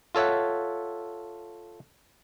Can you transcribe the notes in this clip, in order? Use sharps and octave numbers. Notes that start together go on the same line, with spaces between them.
F4 A4 C#5 E5 F#5